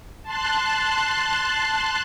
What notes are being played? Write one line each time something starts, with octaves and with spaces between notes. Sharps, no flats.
A5 C6 F#6